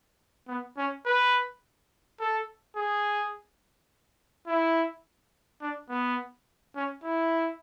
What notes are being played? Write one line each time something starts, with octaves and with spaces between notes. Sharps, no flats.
B3
C#4
B4
A4
G#4
E4
D4
B3
C#4
E4